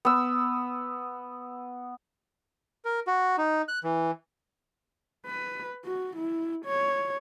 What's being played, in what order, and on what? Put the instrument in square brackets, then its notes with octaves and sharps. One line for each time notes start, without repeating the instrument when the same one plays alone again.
[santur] B3 E6
[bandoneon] A#4
F#4
D#4
F#6
E3
[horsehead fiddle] B4
F#4
E4
C#5